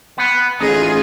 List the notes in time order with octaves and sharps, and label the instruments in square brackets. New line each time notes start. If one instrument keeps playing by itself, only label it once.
[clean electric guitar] B3 F#5
[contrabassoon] A1 [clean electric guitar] D#4 [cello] F4 G#4